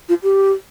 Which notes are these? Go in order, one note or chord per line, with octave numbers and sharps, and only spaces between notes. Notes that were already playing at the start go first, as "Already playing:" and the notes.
F4
G4